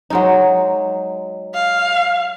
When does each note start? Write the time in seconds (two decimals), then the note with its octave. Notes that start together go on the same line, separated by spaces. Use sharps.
0.10 F#3 G#3 D#4
1.54 F5